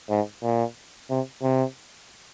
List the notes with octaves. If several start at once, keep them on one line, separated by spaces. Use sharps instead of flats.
G#2
A#2
C3
C3